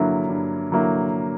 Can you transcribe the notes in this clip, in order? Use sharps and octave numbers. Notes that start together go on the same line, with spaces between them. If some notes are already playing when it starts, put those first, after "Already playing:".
Already playing: G2 D3 F#3 A#3 E4
G2
D3 F#3 A#3 E4